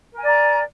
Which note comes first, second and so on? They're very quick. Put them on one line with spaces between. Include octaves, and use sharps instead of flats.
A#4 G#5 D5 A#5